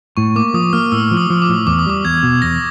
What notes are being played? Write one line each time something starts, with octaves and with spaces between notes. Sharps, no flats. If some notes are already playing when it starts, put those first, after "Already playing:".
A2 C#6
A#3 D6
F3 D#6
A#3 F6
A2 E6
F3
D#6
F3
D6
A2
E2 D6
D#6
G3 D6
E2 G#6
B2
E2 A#6